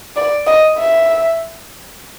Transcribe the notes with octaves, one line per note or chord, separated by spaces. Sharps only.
D5
D#5
E5